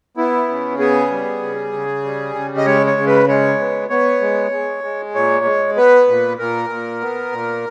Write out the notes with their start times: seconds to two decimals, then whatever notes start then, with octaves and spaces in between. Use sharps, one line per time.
0.17 B3 E4
0.48 C#3
0.79 B3 G#4
1.11 G3
1.42 C#3
1.72 C#3
2.04 G3
2.35 C#3
2.57 D#5
2.66 G#3 C#5
2.87 C#5
2.97 C#3
3.07 B4
3.28 G#3 C#5
3.60 B3
3.90 B3 C#5
4.21 G#3
4.52 G#3
4.84 G#3
5.15 A#2 C#5
5.45 G#3
5.77 B3 B4
6.08 A#2
6.39 A#2 A#4
6.70 A#2
7.01 B3
7.32 A#2